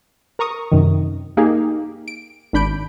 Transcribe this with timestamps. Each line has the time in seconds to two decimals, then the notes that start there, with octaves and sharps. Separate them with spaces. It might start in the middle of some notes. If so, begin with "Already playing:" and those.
0.39 A#4 A#5 C#6 D#6
0.72 F#2 C3 D#3
1.37 A#3 D#4 G4 G#4
2.08 D7
2.53 G#1 D4 B5 G6 D7